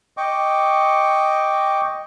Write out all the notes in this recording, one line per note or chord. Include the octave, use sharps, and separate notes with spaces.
D#5 G5 C#6 D6